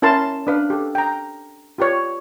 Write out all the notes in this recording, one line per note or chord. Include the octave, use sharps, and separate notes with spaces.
C#4 E4 A#4 A5 B5 C6
D4 B4 F5
G4 A4
G5 A#5
F4 G4 B4 C#5 D5